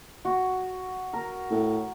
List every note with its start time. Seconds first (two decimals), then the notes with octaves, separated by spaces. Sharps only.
0.25 F#4
1.13 A#4
1.51 A2